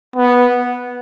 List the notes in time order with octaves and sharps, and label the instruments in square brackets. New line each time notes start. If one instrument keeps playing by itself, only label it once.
[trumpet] B3